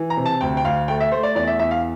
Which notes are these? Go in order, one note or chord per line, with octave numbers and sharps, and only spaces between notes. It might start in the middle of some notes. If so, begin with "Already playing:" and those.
Already playing: E3
A#5
C3
A5
D2 G5
G5
D2 F5
A3 G5
E5
A3 C5
D5
E2 D5
E5
E2 E5
F5